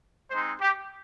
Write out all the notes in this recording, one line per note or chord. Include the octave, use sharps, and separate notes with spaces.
G#3 C4 D#4 C5
G4